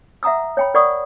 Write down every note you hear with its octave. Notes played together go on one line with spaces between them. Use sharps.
E5 F#5 A#5 D#6 E6
C#5 G5 B5
A#4 D5 F#5 B5 C#6 D#6